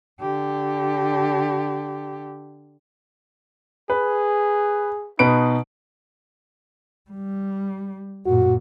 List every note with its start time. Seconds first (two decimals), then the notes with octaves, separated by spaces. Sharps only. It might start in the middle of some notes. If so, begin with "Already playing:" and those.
0.21 D3 G4
3.90 G#4 B4
5.19 B2 D#4 B4 D7
7.10 G3
8.26 F#2 A#2 F#4